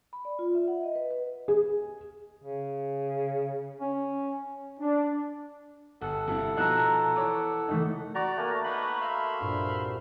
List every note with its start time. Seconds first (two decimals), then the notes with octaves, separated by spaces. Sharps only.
0.13 B5
0.25 D5
0.39 F4
0.55 E5
0.68 F#5
0.83 D#5
0.95 B4
1.11 B4
1.48 G#4
2.44 C#3
3.80 C#4
4.80 D4
6.02 G1 A4 F#5
6.28 G2 C3 E4
6.57 B2 F3 D#4 A#5 E6 F#6
7.16 E3 C#5 D6
7.68 E3 A3 D#4
8.15 F#4 D5 A#5 C#6
8.37 A3 A#3 G#5
8.64 B3 D#4 F#5 B5
9.01 E5 F5 C6
9.41 C2 G2 A#2